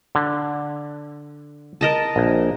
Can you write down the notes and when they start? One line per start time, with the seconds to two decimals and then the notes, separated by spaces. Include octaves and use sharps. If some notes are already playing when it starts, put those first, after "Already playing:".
0.15 D3
1.81 A#4 D#5 A5
2.16 A#1